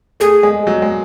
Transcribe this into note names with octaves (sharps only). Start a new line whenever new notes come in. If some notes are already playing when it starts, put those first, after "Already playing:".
A3 G#4
G#3
F#3
G#3